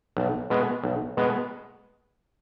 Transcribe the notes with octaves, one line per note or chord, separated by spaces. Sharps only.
B1
B2 G#3 B3
B1
B2 G#3 B3